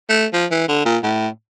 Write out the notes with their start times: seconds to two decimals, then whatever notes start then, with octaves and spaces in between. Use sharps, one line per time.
0.09 A3
0.33 F3
0.51 E3
0.68 D3
0.85 A#2
1.03 A2